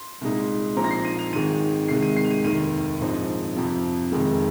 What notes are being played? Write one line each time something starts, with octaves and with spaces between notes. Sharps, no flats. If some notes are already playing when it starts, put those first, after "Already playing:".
Already playing: C6
C2 A#2 G#3 D#4
A#1 A#2 F3 C4 D#4 A#5
A#6
C7
D#7
F7
G#1 G#2 D#3 G#3 D#7
C2 C3 D#3 G#3 C7
D#7
C7
F7
D#7
F1 D#2 D#3 D#7
A#1 G#2 F3 C4 D#4
F2 C3 F3
F1 F2 C3 D#3 G#3